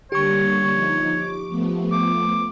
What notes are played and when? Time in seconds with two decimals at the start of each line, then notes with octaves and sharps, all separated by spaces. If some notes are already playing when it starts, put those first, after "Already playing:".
0.12 D3 G3 A#3 G4 C#5 C#6
0.72 F3 D#4
1.13 D6
1.49 F3 A3 B3
1.92 D6